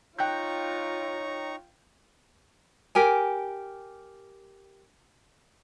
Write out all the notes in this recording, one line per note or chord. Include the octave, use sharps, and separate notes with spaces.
D#4 F4 C#5 G5 A#5 C#6 F#6 G6
G4 A#4 G#5